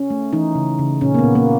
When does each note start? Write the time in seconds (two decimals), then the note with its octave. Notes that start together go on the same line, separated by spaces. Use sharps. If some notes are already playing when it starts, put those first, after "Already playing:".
Already playing: C#4
0.10 A3
0.33 E3 D#4
0.55 C#3
0.79 C#3
1.01 A#2 C#4
1.14 A#3
1.19 B3
1.24 A#2
1.35 A#3